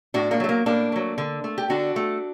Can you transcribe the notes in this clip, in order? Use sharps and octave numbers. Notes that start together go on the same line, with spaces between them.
A2 D4 F#4
A#3 D4
F#3 A3
A#3
A2 A#3 D4
F#3 A3
D3
A3
G4
D3 D4 F#4
A3